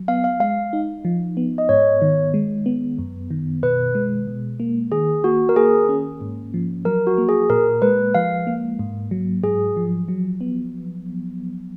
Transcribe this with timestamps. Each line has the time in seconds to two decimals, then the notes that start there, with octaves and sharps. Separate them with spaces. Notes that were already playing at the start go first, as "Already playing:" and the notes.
Already playing: F#3
0.08 B3 F5
0.24 F5
0.40 G#3 F5
0.73 D#4
1.05 F3
1.37 B3
1.58 D#5
1.69 G#2 C#5
2.02 D#3
2.34 G#3
2.66 B3
2.99 F#2
3.31 D#3
3.63 B2 B4
3.95 G#3
4.28 B2
4.60 A#3
4.92 D#3 G#4
5.24 A#3 F#4
5.49 A#4
5.56 A#3 G#4
5.89 C#4
6.21 G#2
6.54 F3
6.85 F#3 A#4
7.07 F#4
7.18 A#3
7.29 G#4
7.50 A#2 A#4
7.82 G#3 B4
8.15 F3 F5
8.47 A#3
8.79 G#2
9.11 F#3
9.44 G#2 G#4
9.77 F3
10.08 F#3
10.41 B3